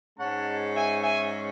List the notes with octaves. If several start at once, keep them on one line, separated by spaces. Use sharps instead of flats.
G#2 G#3 C#4 F#5 A5
E5 G#5
E5 G#5